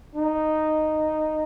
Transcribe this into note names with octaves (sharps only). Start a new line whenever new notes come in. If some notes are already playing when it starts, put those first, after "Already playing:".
D#4